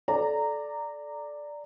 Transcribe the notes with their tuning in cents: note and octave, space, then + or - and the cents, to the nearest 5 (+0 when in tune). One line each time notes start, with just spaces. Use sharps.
A4 -20 D5 +0 A#5 -15